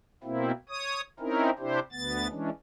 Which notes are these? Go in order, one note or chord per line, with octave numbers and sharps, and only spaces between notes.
B2 A#3 C4 E4
C#5 D#6
C4 C#4 D#4 E4 A#4
C3 D4 E4 G4 C5
D2 B3 A6
E3 G#3 C#4 D4